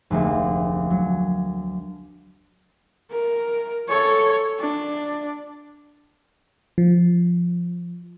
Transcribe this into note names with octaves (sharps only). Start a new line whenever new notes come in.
F1 D2 G#3 A#3
F#3
A#4
A4 C#5
D4
F3